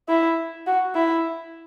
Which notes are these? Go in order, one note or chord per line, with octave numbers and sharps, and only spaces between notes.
E4
F#4
E4